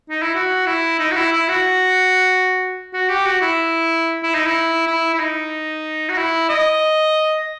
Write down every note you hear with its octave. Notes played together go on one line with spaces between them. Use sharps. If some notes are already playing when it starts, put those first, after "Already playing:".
D#4
E4
F#4
E4
D#4
F#4
E4
E4
F#4
F#4
G4
F#4
E4
E4
D#4
E4
E4
E4
D#4
F#4
E4
D#5